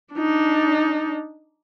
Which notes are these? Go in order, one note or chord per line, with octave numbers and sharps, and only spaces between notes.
D4 D#4